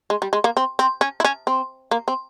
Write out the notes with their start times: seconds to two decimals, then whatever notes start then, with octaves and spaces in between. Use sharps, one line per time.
0.10 G#3
0.22 G3
0.33 G#3
0.44 A#3
0.57 C4
0.79 C4
1.01 C#4
1.20 E4
1.24 C#4
1.47 C4
1.91 A#3
2.08 C4